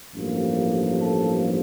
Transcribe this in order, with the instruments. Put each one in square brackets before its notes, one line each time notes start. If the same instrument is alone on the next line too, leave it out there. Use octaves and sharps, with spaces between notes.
[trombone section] A1 G2 F3 A#3
A4